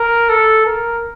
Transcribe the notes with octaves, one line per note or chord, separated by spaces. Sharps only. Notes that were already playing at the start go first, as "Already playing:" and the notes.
Already playing: A#4
A4
A#4